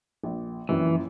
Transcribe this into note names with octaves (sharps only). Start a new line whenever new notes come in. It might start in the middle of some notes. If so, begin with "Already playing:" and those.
A#1
A#1 F#2 E3